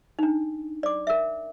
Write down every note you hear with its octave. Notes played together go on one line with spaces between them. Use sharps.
D4 D#4
D5 D6
A#4 E5